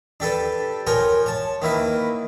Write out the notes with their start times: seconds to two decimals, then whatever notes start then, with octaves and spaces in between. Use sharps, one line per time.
0.20 D4 G4 A4 B4
0.87 F3 A#4 C#5 G5 G#5
1.26 C#5 A5
1.62 D#3 A#3 E4 B4